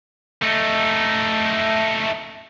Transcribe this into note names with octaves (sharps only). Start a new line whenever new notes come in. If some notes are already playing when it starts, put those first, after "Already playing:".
A3 D#4